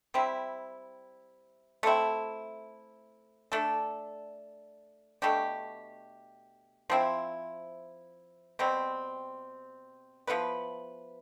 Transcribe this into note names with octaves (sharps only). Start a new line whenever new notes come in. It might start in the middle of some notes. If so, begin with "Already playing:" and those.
G3 C4 E4
A3 C4 E4
A3 D4 A4
B2 A3 D4 G4
F3 C4 E4
B2 G3 C4
F3 B3 E4 B4